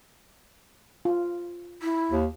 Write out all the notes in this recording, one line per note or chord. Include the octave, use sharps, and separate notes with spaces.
F4
E4
D#2